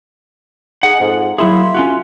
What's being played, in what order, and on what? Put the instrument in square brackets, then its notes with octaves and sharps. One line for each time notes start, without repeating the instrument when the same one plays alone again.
[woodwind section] D#4 G#4 [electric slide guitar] F#5
[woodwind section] F2 G#2
[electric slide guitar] F#3 E4 G#4 [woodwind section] A#3 E5 C6
[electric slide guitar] C#4 F4 F#4